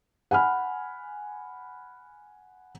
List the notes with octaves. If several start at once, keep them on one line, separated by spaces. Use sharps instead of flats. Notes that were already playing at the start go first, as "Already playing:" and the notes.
F#5 G#5 B5 F6